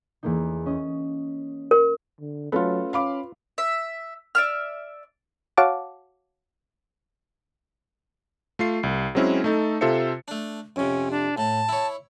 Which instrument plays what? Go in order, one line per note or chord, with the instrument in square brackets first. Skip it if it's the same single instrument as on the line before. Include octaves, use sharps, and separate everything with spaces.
[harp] E2 A#3 D#4
C#4 D#5
[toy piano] A#4
[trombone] D3
[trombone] F#3 [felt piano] A3 C#4 A4 [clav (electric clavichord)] F4 B4
[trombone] C#4 [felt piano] F5 B5 D6
[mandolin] E5
D5 E5 F6
[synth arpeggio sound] F#4 C#5 F5 F#5 A5 D6
[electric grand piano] A3 F4 C7
C2
F#3 G#3 C4 C#4 E4
A3 D#4 A4
C3 F4 A4 C5 E5 C#7
[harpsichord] A3 D4
[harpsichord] F2 C3 [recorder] C#4
[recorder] D4
[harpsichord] A2 [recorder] A5
[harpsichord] E4 C#5